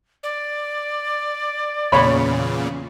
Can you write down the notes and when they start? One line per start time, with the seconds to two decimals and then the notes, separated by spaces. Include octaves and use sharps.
0.23 D5
1.92 E2 A#2 C#3 C#5 B5